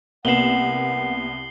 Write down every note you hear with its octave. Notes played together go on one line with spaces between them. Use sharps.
C2 A#3 B3 F#5 C7 E7 F#7 G7